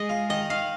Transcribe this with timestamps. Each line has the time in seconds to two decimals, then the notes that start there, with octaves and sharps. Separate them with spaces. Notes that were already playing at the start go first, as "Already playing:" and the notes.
Already playing: G#3 D#5
0.09 F4
0.30 D#3 D#5
0.50 D#3 F5